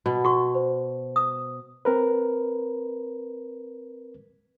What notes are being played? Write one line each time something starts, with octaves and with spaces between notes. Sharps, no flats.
B2
F#4 C#6
C5
D#6
C4 A#4 B4